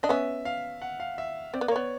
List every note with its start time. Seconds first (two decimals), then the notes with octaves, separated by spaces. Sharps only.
0.03 D4 D#5
0.09 B3 C#4 E5
0.45 F5
0.82 F#5
1.00 F5
1.18 E5
1.54 C4 D5
1.61 B3
1.68 A#3
1.71 B3 C#5